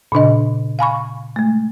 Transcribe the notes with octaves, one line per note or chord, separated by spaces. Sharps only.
A#2 C#3 D4 D#5
F5 G#5 B5 C#6
G#3 A3